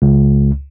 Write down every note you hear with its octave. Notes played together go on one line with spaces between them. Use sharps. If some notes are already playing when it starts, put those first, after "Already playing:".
C#2